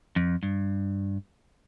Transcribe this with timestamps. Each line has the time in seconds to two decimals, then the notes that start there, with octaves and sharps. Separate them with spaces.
0.16 F2
0.43 G2